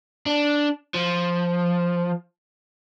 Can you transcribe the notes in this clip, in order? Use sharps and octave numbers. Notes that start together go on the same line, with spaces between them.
D4
F3